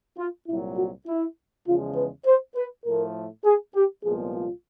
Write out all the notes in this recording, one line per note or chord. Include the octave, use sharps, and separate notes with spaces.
F4
C2 A#2 F#3 E4
F#4
E4
E2 C#3 F3 G#3 F4
B4
C5
B4
A2 F3 A3 A#4
G#4
G4
C2 A#2 F3 G#3 B3 G#4
F4